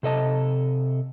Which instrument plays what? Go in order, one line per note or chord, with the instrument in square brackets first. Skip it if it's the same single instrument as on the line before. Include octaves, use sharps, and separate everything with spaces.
[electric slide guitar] C3 A4 D#5 A5